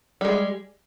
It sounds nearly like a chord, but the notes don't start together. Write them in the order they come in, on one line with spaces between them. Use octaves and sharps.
G3 G#3 G#4